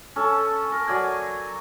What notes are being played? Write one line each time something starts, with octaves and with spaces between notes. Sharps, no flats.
C#4 A4 A5
A#4
F#3 D5 G#5